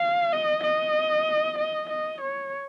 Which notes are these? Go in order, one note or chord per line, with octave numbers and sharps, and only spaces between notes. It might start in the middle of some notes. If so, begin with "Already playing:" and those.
Already playing: F5
D#5
D#5
D#5
D#5
C#5